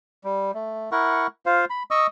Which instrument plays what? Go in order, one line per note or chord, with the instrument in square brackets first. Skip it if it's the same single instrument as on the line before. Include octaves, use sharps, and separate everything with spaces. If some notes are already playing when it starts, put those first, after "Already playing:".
[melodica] G3
A3
E4 A#4 F#5 C#6
F4 C5 F5
B5
D#5 C#6 D#6 E6